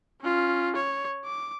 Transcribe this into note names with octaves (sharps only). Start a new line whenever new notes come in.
C#4 F4
C#5
D6